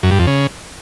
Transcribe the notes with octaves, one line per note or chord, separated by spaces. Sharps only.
F#2
G2
F2
C#3